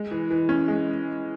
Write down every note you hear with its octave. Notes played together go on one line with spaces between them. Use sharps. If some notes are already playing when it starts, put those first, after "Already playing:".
Already playing: G#3
E3
E3
C#4
G#3